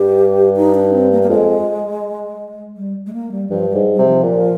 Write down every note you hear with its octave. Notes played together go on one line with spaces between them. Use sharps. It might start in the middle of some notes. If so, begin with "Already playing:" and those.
Already playing: G2 G4
D#4
D4
C4
A#3
A#3
F2 G#3
G3
G#3
A#3
G3
G2 F3
G3
G#2
C3 G3
F3
A#2